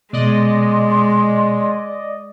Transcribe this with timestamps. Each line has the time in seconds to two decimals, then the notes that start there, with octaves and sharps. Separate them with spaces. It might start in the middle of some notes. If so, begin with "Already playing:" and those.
0.13 B2 G#3 D5 D#5 C6